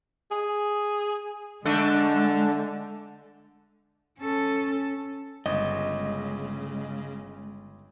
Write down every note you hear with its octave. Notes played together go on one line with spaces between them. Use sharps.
G#4
D3 G#3 A3 D4 A4
C#4 A4
G1 C#3 G#3 D#5